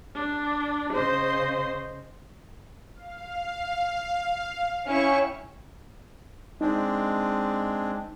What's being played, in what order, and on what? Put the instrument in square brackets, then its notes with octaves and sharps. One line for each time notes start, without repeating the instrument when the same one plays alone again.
[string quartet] D4
C#3 C5 D#5 C6
[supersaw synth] F5
[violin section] C#4 E4 C#6 [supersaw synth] G5
[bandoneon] G#3 C4 D4 [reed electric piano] D#4